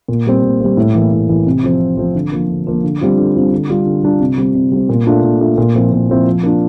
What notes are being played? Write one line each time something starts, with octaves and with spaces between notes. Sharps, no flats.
A#2
G3 C4
A#2
G3 C4
A2
E3 A#3
A2
E3 A#3
C3
F3 C4
C3
F3 C4
D3
F3 A#3
D3
F3 A#3
D3
G3 C4 F4
D3
G3 C4 F4
D3
G3 D4 F4
D3
G3 D4 F4
C3
G3 C4
C3
G3 C4
A#2
A3 D4 F4
A#2
A3 D4 F4
A#2
F3 C4 E4
A#2
F3 C4 E4
F3
A#3 D4 F4